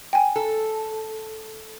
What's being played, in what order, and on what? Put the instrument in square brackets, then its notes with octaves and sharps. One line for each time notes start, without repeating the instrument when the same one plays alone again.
[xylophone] G5 G#5
[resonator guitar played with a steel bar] A4